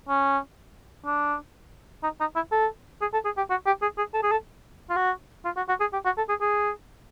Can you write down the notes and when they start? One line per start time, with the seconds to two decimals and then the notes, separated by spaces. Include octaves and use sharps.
0.09 C#4
1.06 D4
2.03 D#4
2.20 D#4
2.36 E4
2.52 A4
3.01 G#4
3.14 A4
3.25 G#4
3.37 G4
3.50 F#4
3.66 G4
3.82 G#4
3.98 G#4
4.14 A4
4.23 G#4
4.31 A4
4.90 F4
4.96 F#4
5.45 F4
5.57 F#4
5.69 F#4
5.80 G#4
5.93 G4
6.05 F#4
6.18 A4
6.29 G#4
6.41 G#4